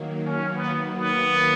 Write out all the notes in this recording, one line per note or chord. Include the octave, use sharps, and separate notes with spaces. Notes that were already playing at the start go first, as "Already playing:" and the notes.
Already playing: D#3 F#3 A#3
C#4
B3
B3